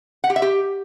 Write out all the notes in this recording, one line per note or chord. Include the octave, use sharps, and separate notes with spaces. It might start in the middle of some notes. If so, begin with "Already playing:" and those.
F#5
G4
E5
G4